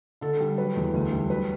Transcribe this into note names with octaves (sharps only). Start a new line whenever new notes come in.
D3 A4
G3
F#3 B4
E2
D2
G3
F#3 B4